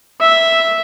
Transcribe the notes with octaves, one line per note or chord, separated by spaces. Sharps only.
E5